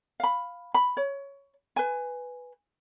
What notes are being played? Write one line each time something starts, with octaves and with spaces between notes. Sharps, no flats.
F5 B5
B5
C#5
B4 G#5